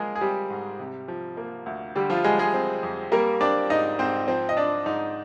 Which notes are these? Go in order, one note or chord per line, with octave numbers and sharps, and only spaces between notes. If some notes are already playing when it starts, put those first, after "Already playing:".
Already playing: F3 G#3 A#3 G#4 A#4
G#4
G3 C4 G4
G#2
C3
F3
A#3
D2
D3 G3 G4
F3 F4
G3 G#3 G#4
G#3 G#4
C4
F2
G3 A#3 A#4
C4 D4 D5
G#2 D#4 D#5
G#2 C4 C5
F3 C4 C5
D#5
C4 D4 D5
G#2 D#4